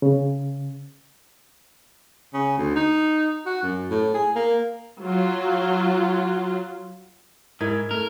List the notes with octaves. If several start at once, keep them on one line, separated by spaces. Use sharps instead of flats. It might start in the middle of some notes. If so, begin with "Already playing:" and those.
C#3
C#3
D2
D#4
F#4
F#2
A2
G#4
A#3
F#3 F4
G#2 E4 A#4 G#6
A3 A#4